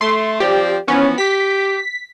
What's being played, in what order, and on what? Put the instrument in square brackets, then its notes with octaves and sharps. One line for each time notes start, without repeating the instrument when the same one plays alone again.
[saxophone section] A3 [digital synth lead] C6
[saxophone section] F3 C4 D5 [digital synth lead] G4
[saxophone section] E3 F3 B3 [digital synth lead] C#4
[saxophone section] G4 [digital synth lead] B6